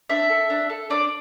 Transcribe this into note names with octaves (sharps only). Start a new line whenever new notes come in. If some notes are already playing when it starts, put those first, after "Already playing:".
D4 E5
A4
D4
A4
D4 D5